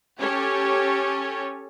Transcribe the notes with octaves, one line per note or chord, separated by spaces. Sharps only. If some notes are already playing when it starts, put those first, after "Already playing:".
C#4 G4 A4 C#5